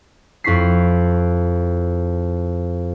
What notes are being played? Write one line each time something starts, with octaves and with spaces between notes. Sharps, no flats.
F2 E4 C#6 B6 C7